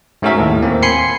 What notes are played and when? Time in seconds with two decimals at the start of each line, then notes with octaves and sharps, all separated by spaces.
0.22 G#2 A3 C#4 F#4 A#4 E5
0.38 D#2 A2
0.62 A#3 C4
0.83 G#5 B5 C6 C7 C#7